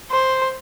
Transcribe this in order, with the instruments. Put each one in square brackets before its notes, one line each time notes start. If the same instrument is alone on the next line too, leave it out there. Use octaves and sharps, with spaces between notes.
[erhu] C5